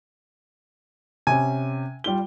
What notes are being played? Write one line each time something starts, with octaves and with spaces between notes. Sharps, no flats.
C3 C#4 G#5
G3 F4 G7